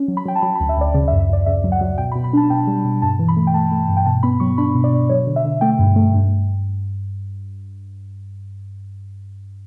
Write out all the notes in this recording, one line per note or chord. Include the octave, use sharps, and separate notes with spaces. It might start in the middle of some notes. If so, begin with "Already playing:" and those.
Already playing: C#4
F#3
B5
F#3 G5
A5
F#3 B5
B5
D2
E5
D2 D5
C#3 D5
E5
F#2
E5
F#2 D5
C#3 E5
F#3
F#5
F#3
B2 G5
B5
B2
B5
D4 A5
B2 G5
G3
B2
G2 A5
E3
B5
A3
G5
A3 A5
A3
G2
G5
B2 A5
B3 B5
F#3 C#6
D4 B5
B2
D5
B2
F#3 C#5
D3
E5
D3
A3 G5
G2
A3
G2